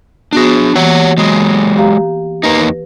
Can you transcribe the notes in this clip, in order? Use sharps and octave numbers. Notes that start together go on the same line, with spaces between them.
B3 D4 F#4 G#4 A#6
E3 A#3 G4 C#5 F#5
F#3 G#3
G4 F5 A#5
E2 A#3 D#4 B4